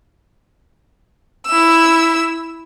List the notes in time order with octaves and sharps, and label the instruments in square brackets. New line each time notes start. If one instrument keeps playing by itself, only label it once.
[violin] E4 E6